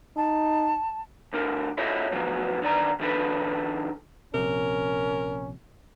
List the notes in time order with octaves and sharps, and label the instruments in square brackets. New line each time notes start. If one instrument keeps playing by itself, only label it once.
[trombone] D#4 [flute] A5
[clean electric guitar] D2 D3 A#4
E4 F4 A4 C#5 D#5
D2 F3 F#3 B3
D3 D#3 D5 A#5
D#3 F3 D4 A4 B4
[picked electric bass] A#1 C3 [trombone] C#4 [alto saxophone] A#4